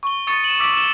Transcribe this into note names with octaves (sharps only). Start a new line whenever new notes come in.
C#6 G7
C#6 D#6 A6 C#7 D#7
E7 F#7
D6 E6 B6 D7
E6 E7 G7